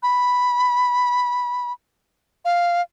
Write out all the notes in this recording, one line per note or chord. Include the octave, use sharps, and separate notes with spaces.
B5
F5